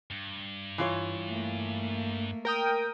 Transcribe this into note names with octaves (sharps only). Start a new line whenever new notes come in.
G2
E3 F4 C#5
A3 A#3
A#4 G5 D#6